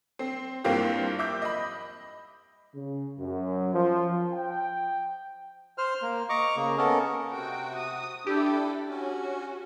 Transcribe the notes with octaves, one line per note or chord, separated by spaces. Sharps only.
C4
G2 E3 A#3 C4 F4 G4
E5 D6 G6
D#5 B5
C#3
F#2
F3
G5
C5 F6
A#3
D#5 A#5 C#6 D6
C#3 A#3
B3 C#4 A4 A#4 D#5
C3 F#4 G5
D#6
D4 E4 G4 A4
C#4 F#4